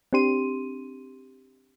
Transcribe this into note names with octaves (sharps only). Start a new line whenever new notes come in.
C4 D4 G4 C6 D#7